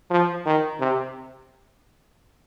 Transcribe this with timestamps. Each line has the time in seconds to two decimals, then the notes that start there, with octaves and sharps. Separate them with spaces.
0.10 F3
0.46 D#3
0.80 C3